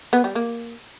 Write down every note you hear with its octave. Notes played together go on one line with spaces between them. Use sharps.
B3
G3
A#3